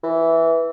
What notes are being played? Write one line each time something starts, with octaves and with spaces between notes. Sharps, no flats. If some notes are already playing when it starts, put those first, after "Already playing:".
E3